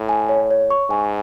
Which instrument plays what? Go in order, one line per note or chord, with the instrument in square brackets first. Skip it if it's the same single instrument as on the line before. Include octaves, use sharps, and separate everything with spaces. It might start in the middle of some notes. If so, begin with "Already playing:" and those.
Already playing: [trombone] A2
[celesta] G#5
C#5
C#5
C#6
[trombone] G#2 [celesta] G#5